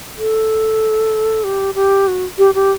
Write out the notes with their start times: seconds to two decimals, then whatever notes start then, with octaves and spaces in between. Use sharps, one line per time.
0.17 A4
1.44 G4
1.75 G4
2.07 F#4
2.38 G4
2.55 G4